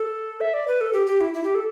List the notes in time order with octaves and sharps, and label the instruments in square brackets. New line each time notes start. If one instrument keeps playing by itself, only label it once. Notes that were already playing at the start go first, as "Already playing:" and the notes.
Already playing: [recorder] A4
E5
D5
B4
A4
G4
G4
E4
E4
G4
A4